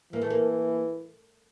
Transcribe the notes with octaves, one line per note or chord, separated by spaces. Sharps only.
E3 A#3
A3
A#3